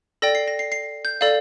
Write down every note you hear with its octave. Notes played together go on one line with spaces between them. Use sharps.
A4 D5 G5 A#6
C7
A#6
C7
C7
G6
A4 D5 F5